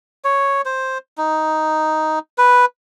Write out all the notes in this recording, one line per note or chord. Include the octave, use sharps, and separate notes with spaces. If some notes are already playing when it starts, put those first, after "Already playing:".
C#5
C5
D#4
B4